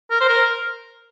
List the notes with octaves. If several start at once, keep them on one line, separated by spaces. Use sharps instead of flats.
A#4
C5
A#4